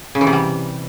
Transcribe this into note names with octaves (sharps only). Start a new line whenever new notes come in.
C#3
E3
C3
G3